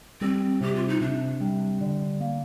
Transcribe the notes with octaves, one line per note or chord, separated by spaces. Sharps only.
G3 C4
C3 G4
F4
D#4
C3 D4
G3
D3
A#3